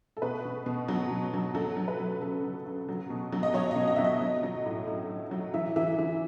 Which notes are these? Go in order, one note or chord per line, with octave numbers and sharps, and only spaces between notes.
A4
B2 B4
B2
B2
F#3
B2
F#3
F#3 A4
F#3
B4
F#3
C#3 A4
F#3
C#3
F#3
B2
F#3
D#5
F#3 C#5
D#5
B2
D#5
F#3 E5
D#5
F#3
F#3
A2
A2
F#3
F#3
E3 E5
E3 E5
E3